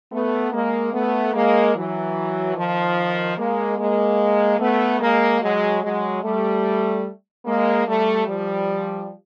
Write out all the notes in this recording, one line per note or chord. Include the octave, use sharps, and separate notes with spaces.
A3 B3
G#3 A#3
A3 B3
G#3 A#3
E3 F#3
D#3 F3
G#3 A#3
G#3 A#3
A3 B3
G#3 A#3
F#3 G#3
F#3 G#3
G3 A3
G#3 A#3
G3 A3
F3 G3